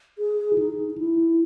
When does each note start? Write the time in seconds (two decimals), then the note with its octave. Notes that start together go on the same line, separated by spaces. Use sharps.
0.19 G#4
0.53 E4
0.58 D#4
0.90 D#4
0.98 E4